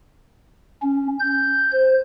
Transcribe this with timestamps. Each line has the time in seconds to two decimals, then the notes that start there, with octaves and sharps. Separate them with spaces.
0.82 C#4
1.19 G6
1.72 C5